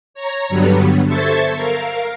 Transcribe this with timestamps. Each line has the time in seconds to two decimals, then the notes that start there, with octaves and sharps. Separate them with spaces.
0.14 C#5 A#5
0.49 G2 D3 F#3 G3 B3
1.06 A4 C5 E5 C#6 G#6 A6
1.55 A#4 F5